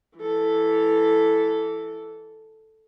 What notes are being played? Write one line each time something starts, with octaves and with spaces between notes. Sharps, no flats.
E3 A4